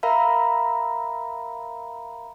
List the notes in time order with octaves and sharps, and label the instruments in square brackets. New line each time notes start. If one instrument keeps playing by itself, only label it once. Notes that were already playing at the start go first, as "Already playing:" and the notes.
[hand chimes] A#4 E5 F5 A#5 B5